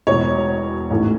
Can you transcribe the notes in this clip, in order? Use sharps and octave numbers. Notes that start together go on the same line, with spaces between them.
E1 E2 B2 C#5
A1 G#2 E3 A3